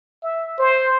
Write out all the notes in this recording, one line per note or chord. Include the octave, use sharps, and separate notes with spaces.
E5
C5